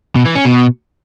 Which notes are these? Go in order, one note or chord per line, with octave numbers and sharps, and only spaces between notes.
B2
E3
C#4
B2